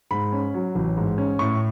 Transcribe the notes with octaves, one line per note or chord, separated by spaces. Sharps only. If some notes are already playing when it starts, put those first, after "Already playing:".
G#2 B5
C#4
F#3
A1
G#2
C#4
A2 C#6